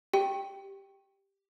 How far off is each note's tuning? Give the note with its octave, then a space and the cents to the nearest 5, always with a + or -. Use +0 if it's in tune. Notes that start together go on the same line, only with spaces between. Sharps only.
G4 +0 G5 +0